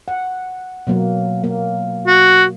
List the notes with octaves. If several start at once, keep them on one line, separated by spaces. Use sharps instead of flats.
F#5
B2 F#3 A#3
A#3
F#4